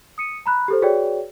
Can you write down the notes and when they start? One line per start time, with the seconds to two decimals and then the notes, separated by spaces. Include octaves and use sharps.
0.18 D#6 C#7 D#7
0.46 A#5 B5 F#6
0.68 G4 A4 C5
0.82 F#4 G#4 B4 C#5 D5 G5